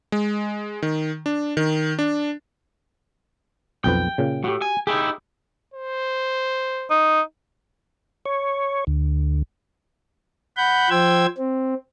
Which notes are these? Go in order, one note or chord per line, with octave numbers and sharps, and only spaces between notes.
G#3
D#3
D4
D#3
D4
B1 F2 B4 G5
A#2 C#3
A2 F#4 G4
G#5
D#4 E4 G4 G#4
C5
D#4
C#5
D2
F#5 B5 G6
F3 C5 G5 E6 G#6
C4